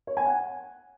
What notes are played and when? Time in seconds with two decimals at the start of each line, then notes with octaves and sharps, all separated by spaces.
0.07 C#5
0.17 G#5
0.26 F#5